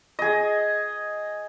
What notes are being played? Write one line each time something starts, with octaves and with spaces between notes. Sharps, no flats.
G#4 D#5